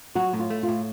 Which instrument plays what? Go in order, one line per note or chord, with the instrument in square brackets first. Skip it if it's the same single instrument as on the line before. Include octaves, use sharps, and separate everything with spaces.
[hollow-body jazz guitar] F#3 [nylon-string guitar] F#4
[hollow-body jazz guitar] A2
[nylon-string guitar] F4
[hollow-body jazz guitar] A3
[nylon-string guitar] F4
[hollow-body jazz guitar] A2